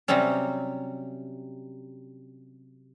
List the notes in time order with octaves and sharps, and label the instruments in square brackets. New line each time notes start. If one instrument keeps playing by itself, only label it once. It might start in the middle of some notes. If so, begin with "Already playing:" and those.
[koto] C3 F#3 G3 C4 C#4